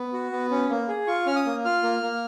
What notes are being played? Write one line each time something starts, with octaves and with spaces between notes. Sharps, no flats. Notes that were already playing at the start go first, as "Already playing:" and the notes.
Already playing: B3
F#4
B3
C#4
A#3
G#4
F4 C#6
C#4 F6
D#6
A#3
F4 F6
A#3
A#3